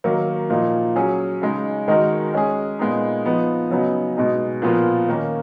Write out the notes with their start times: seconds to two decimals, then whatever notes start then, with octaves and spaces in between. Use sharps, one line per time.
0.04 D#3 F#3 A#3
0.50 A#2 F3 A#3 D#4
0.96 F#3 C#4 G#4
1.42 C#3 G#3 D#4
1.88 D#3 G#3 D#4 F#4 A#4
2.34 G#3 C#4 G#4
2.79 A#2 G#3 B3 D#4
3.25 F3 B3 D#4
3.70 C#3 F#3 B3 D#4
4.17 B2 G#3 D#4
4.62 A#2 F3 B3 F4 A#4
5.08 D#3 A#3 C#4